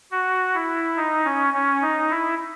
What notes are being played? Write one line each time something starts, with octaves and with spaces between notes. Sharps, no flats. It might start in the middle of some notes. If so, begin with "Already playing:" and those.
F#4
E4
D#4
C#4
C#4
D#4
E4